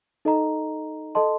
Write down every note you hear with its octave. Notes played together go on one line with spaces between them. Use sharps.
D#4 A4 D#5 A#5
A4 D#5 A5 C6